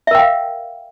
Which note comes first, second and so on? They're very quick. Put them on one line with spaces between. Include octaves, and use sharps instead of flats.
E5 A#4 G5 F5